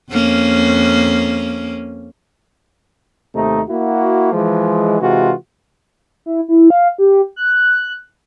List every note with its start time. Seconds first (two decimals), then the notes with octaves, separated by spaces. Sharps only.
0.12 F2 A#3 C#4
3.34 D#2 C3 A3 D#4
3.68 A#3 E4 F#4
4.32 E3 F3 G#3
4.99 C3 E3 G#3 F4 F#4
6.26 E4
6.48 E4
6.70 F5
6.98 G4
7.36 F#6